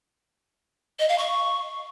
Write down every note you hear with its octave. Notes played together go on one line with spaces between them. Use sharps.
D#5
F5
C#6